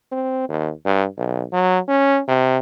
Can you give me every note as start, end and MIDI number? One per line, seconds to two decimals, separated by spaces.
0.12 0.45 60
0.49 0.71 39
0.85 1.05 43
1.17 1.44 35
1.53 1.79 54
1.88 2.19 61
2.28 2.58 48